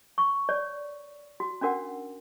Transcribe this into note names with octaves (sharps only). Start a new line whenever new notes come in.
C#6
C#5 D5
F#4
C#4 D4 F#4 A#4 F#5